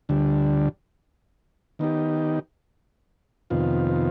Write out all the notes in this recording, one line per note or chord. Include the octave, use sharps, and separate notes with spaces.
D2 D3 G3
D#3 B3 D#4 G4
F2 C3 D#3 B3 F4